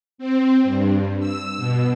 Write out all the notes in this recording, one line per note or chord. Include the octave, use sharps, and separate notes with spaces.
C4
G2
E6
B2